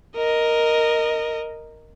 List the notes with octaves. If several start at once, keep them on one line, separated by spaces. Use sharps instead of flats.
A#4 D#5